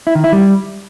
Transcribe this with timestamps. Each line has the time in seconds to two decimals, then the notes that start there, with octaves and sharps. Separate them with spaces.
0.07 E4
0.15 D#3
0.24 E4
0.32 G3